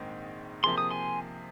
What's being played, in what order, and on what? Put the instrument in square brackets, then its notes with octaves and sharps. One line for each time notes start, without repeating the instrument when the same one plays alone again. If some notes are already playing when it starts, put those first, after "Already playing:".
Already playing: [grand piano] A#1 G#2 D#3 C4 D#4
[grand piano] C3 F3 A#3 G#4 [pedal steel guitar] C6
[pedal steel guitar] D#6
G#5 C6